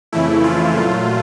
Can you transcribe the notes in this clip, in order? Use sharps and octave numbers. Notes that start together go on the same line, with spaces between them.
F2 C#3 E3 A3 E4
F4
A#2 F#3 A3